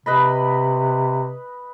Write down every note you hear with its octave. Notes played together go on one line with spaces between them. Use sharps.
C3 B4 D#5 B5